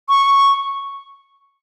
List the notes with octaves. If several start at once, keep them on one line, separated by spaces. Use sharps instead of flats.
C#6